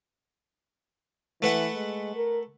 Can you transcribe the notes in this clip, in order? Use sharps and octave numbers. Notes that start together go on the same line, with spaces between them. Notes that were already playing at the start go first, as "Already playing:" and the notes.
E3 A3 B4 F#5
G#3
A#4